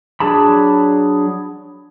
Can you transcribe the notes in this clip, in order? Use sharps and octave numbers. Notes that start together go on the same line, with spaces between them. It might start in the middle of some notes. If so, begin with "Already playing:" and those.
F#3 D4 G#4 A5 B5